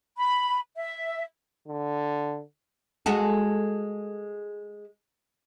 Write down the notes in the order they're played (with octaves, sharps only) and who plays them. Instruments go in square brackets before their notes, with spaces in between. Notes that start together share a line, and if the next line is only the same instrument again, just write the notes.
[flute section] B5
E5
[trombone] D3
[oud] G#3 F#4 A4